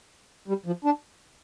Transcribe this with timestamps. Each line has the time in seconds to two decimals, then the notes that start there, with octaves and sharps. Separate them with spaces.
0.48 G3
0.66 F3
0.85 D4